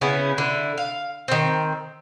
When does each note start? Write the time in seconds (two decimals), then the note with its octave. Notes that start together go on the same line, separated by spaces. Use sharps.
0.01 C#3 B3 C#4 E4
0.38 D3 E4
0.78 F5
1.28 D#3 C4